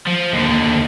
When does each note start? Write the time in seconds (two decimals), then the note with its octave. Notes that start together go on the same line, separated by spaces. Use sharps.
0.07 F3
0.34 D#2 D3